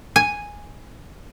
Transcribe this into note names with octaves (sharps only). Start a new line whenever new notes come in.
G#5